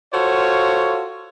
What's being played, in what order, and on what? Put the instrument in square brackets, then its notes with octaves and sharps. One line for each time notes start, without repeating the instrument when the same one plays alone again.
[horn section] F4 F#4 A4 C5 C#5 F5